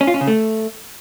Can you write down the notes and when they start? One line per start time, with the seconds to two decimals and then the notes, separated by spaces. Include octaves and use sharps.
0.01 C#4
0.07 F4
0.14 C#4
0.21 C#3
0.27 A3